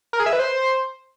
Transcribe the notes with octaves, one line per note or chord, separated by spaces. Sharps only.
A#4
G#4
E5
B4
C5